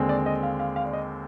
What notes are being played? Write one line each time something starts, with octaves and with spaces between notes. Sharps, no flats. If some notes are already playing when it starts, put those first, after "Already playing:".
Already playing: D#2 D3 G#3 C4
D5
D#5
F5
F5
F5
D5
D#5